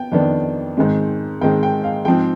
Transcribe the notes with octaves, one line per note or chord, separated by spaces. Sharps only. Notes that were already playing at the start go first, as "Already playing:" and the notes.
Already playing: B3 G5
F2 D#3 B3 D4
G#2 D#3 G#3 C4
G#2 D#3 G#3 C4 G5
G5
F5
G#2 F3 C4 G5